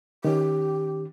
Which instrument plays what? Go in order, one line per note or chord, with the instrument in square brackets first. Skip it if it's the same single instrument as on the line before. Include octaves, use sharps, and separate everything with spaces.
[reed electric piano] D#3 C#4 [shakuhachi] G4